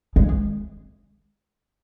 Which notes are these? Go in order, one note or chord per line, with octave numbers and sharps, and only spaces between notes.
G#3